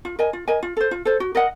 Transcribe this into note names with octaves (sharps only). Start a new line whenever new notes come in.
F4
A#4 D#5 G#5
F4
A#4 D#5 G#5
F4
A4 C5
F4
A4 C5
F#4
A#4 D#5 F#5